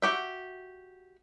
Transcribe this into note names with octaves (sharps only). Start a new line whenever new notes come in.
F#4 G4 E5